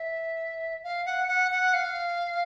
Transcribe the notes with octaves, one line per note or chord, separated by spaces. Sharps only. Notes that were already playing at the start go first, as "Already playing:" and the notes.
Already playing: E5
F5
F#5
F#5
F#5
F5